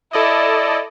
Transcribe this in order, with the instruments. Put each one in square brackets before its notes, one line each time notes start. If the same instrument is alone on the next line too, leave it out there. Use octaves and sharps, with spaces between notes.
[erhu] E4 [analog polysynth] A4 D5 D#5